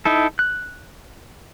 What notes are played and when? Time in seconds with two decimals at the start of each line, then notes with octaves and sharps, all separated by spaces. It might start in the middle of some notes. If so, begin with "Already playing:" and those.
0.05 D#4 E4 A4
0.39 F#6